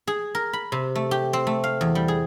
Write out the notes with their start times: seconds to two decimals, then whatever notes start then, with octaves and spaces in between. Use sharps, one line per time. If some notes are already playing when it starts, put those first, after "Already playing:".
0.07 G#4
0.35 A#4
0.53 B5
0.72 C3
0.95 A3
1.11 G4
1.33 C4
1.47 A3
1.64 F5
1.81 E2
1.95 G3
2.08 G#4